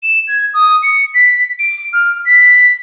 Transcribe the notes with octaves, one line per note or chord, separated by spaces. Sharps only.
E7
G#6
D#6
C#7
B6
D7
F6
B6